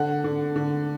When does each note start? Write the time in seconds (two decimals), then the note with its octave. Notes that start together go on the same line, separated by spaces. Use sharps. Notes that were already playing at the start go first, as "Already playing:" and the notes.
Already playing: D3 F#5
0.24 D3
0.56 D3